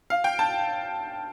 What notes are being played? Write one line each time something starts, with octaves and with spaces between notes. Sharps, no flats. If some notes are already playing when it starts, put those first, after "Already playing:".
F5
G5
A5